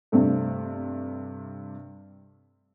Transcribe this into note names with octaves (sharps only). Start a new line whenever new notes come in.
G2 C3 A3